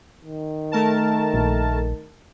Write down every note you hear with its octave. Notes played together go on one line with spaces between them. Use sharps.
D#3
A3 A#4 A5
A#1